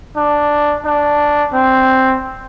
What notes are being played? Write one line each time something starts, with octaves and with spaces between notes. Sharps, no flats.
D4
D4
C4